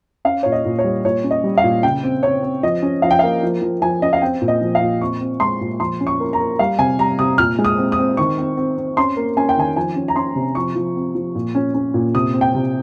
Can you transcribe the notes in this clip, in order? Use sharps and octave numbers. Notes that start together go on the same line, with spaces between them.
C#4 F5
A#2 C#5
D#5
A#2
C#5
G3
A#2 C#5
C#4
D#5
G3
F5
A#2
C#3 G5
C4
C4 C#5
C4
F3 D#5
C#4
F3 F5
G5
A#3 F5
F3
F3
F3 G#5
C#4 D#5
F5
C4 G5
A#2
D#5
F3
F5
A#2
C4 C#6
C4
G#3 C6
A#2
F3 C6
C#4
C#6
A#3
A#5
A#3
G3 F5
C3 G#5
G3 A#5
C3 D#6
A#2 F6
G#3
D#6
C4
D#6
C4
D#3 C#6
C4
C4
C4
C#4 C6
A#3
C#4 G#5
G5
D#3 G#5
F3 G#5
C#4
A#5
C#4 C6
C3
F3 C#6
F3
C4
F3
A#2
C#4
C#4
A#2
C3 D#6
C4
G5
C3